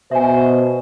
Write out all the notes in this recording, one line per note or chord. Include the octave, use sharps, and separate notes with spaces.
B2 C5 E5 G#5